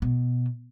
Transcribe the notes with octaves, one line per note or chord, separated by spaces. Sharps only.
B2